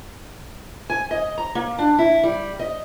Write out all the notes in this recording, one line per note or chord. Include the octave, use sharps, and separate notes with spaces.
G#5
D#5
A#5
A#3
D4
E4
G3
D#5